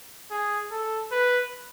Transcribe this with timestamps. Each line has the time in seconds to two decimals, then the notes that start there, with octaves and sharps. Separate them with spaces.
0.31 G#4
0.71 A4
1.12 B4